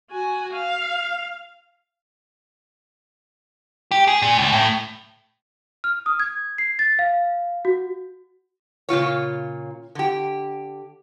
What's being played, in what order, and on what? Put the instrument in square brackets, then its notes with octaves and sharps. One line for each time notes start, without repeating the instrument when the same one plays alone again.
[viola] F#4 G#5
F5
[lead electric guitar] G4
G#4
A#2
C#2
A2
[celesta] F6
D#6
G#6
C7
A6
F5
F#4
[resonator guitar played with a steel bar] A#2 C#3 F4 C#5
D3 G4